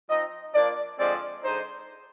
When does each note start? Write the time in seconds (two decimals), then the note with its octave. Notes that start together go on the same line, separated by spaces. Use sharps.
0.08 F3 C4 D#4 D#5
0.54 F3 A#3 D4 D5
0.99 D3 F3 G#3 C4 D5
1.44 D3 G#3 D#4 C5